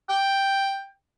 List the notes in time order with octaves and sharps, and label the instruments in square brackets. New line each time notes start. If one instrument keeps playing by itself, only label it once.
[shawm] G5